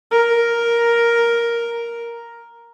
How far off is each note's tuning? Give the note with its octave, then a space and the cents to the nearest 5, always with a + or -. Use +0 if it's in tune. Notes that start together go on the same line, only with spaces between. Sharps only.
A#4 +5